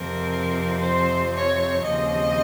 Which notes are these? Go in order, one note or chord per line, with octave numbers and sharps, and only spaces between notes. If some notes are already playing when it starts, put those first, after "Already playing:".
Already playing: F2 C3 F3 C4 A#4
C5
C#5
D#2 C#3 F3 C4 D#5